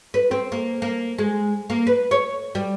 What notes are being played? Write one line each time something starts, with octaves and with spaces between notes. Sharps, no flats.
B4
C4
A#3
A#3
G#3
A#3
B4
C#5
G3